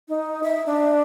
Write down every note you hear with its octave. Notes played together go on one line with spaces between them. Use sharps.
D#4
E5
D4